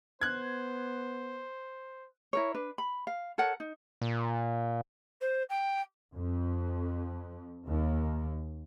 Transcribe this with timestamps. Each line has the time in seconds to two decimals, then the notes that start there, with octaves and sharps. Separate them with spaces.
0.21 B3 C5 F#6 G#6
2.33 E4 A#4 C#5
2.54 D4 B4
2.78 B5
3.07 F5
3.38 A4 A#4 C#5 F#5
3.60 D#4
4.02 A#2
5.21 C5
5.49 G5
6.13 F2
7.66 D#2